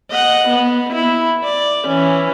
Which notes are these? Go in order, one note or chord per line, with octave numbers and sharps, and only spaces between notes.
D#5 F#5
B3
E4
D5
E3 C#4